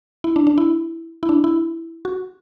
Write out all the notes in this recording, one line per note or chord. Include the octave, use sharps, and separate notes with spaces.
E4
D4
D4
E4
E4
D4
E4
F#4